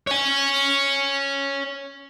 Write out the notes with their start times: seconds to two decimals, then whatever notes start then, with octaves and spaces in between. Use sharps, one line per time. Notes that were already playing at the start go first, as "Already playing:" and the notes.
0.07 C#5 G#5